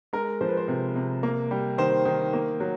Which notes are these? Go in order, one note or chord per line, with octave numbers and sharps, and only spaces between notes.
G#3 A#4
F3 C5
B4
C5
C3
C3
A#3
G3
D#3 C5
D#3
A#3
F#3